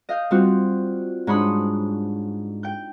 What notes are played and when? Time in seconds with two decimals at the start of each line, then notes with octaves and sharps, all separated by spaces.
0.09 D#5 F5 G6
0.31 G3 C4 F4 F#4
1.27 G#2 D4 C#5 B5 C6 D#6
2.63 G5 G6